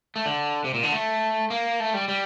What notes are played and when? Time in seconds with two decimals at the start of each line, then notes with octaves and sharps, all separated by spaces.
0.16 A3
0.26 D3
0.64 C3
0.74 A#2
0.83 D3
0.93 A3
1.50 A#3
1.80 A3
1.94 G3
2.08 G3